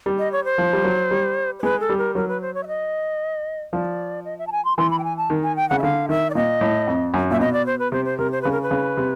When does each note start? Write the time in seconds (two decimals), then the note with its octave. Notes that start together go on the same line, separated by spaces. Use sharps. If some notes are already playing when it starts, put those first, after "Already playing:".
0.06 G3
0.18 D#5
0.32 C#5
0.44 C5
0.58 F3
0.73 G3
0.84 F#3
1.11 G3
1.59 C5
1.63 G#3 B4
1.80 A4
1.89 G3
1.98 A#4
2.15 F#3 A#4
2.28 B4
2.41 C5
2.54 C#5
2.63 E5
2.67 D#5
3.73 F3 D5
4.25 D#5
4.39 E5
4.47 A5
4.52 G#5
4.65 C6
4.78 E3 C6
4.91 B5
4.99 G5
5.04 G#5
5.17 A5
5.30 D#3
5.43 G#5
5.56 G5
5.69 C#3 F#5
5.79 E5
5.83 D3 F5
6.09 D#3 E5
6.30 D5
6.35 A#2 D#5
6.61 A2
6.87 F2
7.14 F#2
7.31 A#2 E5
7.40 B2 D#5
7.53 D5
7.66 C5
7.79 B4
7.92 C3 C5
8.05 C5
8.18 C3 A#4
8.32 C5
8.42 C#3 B4
8.52 A#4
8.62 B4
8.71 C#3
8.97 C3